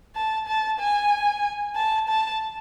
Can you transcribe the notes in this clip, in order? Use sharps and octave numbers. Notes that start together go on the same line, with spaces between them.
A5
A5
G#5
A5
A5